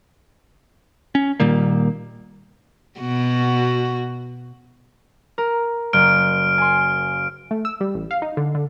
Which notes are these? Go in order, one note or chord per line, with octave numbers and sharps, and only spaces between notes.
C#4
A#2 D#3 G3 A#3
B2 F#4
A#4
F#1 F6 D7
G#5 C6
A3
E6
G3
A1
F5
D#4
D3
D3